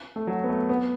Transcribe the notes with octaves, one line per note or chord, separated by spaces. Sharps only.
A3
F#3
B3
A3
B3